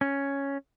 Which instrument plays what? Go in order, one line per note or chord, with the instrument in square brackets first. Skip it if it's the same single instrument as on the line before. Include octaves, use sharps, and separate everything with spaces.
[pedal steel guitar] C#4